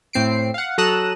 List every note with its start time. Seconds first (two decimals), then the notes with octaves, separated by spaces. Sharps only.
0.13 A2 C4 C7 D7
0.54 F5 F#5
0.78 F#3 A4 A#5 D#6 F#6 E7